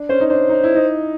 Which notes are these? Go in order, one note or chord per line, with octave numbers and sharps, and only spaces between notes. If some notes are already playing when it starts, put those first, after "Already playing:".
Already playing: D4
C#4 C5
D#4
D4 C5
D#4
E4
D#4